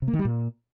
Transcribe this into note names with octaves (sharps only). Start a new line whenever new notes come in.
C3
A#3
D#3
G3
A#2